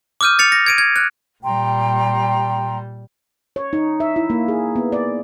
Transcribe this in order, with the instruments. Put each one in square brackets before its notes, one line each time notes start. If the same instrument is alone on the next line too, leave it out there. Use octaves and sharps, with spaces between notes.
[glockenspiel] D6 D#6 F6 G6 D#7
A6 C#7 F7
A#6
G#6 D7 D#7
G#6
F#6
[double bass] A#2 G3 [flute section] G5 A#5 C6
[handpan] C#5
D#4
E5
E4
A#3
G#4
B3
D5